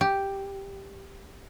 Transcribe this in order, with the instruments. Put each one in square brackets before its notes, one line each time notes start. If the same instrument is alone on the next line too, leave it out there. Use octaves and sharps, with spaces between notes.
[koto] G4